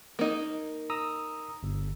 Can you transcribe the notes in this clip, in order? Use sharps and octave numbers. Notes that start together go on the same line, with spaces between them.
A#3 D#4
A#5 D#6 E6
G1